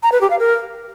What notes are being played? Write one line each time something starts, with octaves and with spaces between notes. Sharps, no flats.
A#5
B4
G4
F5
A#4